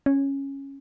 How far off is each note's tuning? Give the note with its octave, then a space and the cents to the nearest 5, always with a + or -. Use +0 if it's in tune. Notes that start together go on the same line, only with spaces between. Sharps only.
C#4 -10